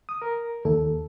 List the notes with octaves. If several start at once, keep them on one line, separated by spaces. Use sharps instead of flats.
D#6
A#4
D#2 A4